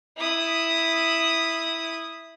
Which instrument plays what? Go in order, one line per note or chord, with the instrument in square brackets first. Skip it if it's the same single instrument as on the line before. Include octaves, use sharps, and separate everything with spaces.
[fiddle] E4 D#6